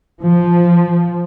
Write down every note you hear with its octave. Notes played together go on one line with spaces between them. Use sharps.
F3